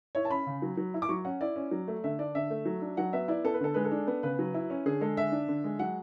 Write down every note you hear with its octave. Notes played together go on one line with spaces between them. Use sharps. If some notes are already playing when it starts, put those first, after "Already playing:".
E4 C#5
A5
C#4 B5
C#3
F#3
F#3
E4
D6
F#3 C#6
C#4 F#5
E4 D5
C#4
F#3
A3
D3 E5
D4 D5
D3 E5
A3
F#3
D4
F#3 F#5
B3 E5
E4 D5
B3 A4
B4
D3 A4
G#3 B4
A4
D4
B3
C#3 B4
F#3
E4
C#4
D3 G#4
G#3 A4
D3 E5
D4
D3
G#3
F#3 F#5